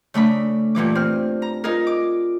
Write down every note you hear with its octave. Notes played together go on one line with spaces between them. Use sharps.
C#3 A3 D4 B5
G2 A#2 E3 D6
C4 F6
A#5
D#4 F4 G#4 A#4
D6